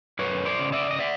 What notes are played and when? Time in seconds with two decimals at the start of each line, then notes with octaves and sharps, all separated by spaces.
0.19 F#2 B4 C#5
0.45 C5 D5
0.59 C#3
0.72 D5 E5
0.91 D#5
0.99 D5 E5